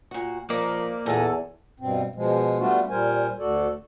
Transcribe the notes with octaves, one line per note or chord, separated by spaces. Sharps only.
A#2 F#4
F3 A#3 D#4 A#4 D5
E2 A#2 G#3 A4
G2 B2 C4
B2 F3 G#3
G3 A3 B3 D4 F4 F#4
A#2 G3 A#4 C5 G#5
D2 F#4 A4 D5